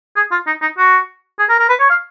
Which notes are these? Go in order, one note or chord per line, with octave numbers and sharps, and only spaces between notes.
G#4
F4
D#4
D#4
F#4
G#4
A#4
A#4
B4
C#5
F5